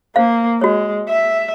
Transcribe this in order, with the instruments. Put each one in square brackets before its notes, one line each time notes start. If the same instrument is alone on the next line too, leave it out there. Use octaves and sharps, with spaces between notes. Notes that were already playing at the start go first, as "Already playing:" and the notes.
[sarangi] A#3 [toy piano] C5 F5
[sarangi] G#3 [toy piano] F#4 C#5
[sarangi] E5